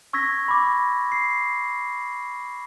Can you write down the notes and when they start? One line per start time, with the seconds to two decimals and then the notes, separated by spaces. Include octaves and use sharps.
0.13 C#6 E6 G#6 A#6 B6
0.48 B5 D6
1.12 C7